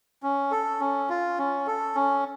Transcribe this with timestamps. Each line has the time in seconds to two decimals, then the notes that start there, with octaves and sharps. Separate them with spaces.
0.23 C#4
0.51 A4
0.80 C#4
1.10 F4
1.38 C#4
1.67 A4
1.95 C#4